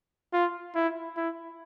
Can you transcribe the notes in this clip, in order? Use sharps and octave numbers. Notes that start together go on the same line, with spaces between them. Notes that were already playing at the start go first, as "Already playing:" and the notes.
F4
E4
E4